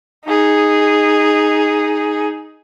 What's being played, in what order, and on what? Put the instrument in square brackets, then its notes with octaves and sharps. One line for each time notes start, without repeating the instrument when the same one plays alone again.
[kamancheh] D#4 G#4